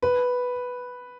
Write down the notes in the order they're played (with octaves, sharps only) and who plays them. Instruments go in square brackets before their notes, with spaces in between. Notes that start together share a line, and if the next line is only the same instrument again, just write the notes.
[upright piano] B4